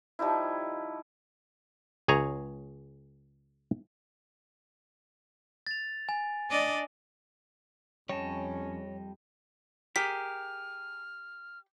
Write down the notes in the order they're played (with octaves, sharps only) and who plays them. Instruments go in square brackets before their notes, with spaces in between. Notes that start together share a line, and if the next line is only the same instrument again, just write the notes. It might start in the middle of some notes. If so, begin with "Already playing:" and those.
[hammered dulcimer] F3 G3 D#4 E4
[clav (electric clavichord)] C#2 G#4 C#5 A#5
[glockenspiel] A6 F7
G#5
[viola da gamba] D4 D5 D#5
[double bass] F2 [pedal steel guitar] G3 D#5 A5 [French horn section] C#4 [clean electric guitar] C#5
[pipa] G4 [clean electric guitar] G#4 A#4 [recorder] F6 [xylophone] B6